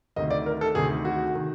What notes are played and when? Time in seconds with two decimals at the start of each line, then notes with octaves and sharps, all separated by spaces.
0.16 D2 C3 D#3 D#5
0.30 D5
0.46 A#4
0.61 A4
0.75 D2 C3 D#3 G#4
1.05 F#4
1.35 D#3